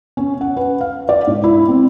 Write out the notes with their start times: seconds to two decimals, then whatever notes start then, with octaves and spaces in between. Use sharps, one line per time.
0.17 C#4
0.41 F#5
0.56 B4
0.81 F5
1.09 D5
1.27 G#2
1.44 E4
1.68 C4